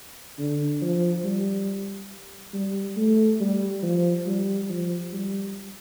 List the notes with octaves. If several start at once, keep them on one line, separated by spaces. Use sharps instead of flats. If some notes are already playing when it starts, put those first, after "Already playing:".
D3
F3
G3
G3
A3
G3
F3
G3
F3
G3